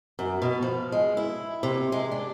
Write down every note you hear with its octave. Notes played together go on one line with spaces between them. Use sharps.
F#2
B2
F3
G#3
E4
C3
G#3
D4